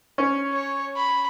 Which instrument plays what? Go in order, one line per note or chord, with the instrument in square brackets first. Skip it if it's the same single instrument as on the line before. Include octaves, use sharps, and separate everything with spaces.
[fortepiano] C#4
[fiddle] C#5
B5